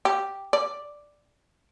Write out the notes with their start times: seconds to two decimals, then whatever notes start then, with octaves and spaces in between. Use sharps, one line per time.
0.05 G4
0.53 D5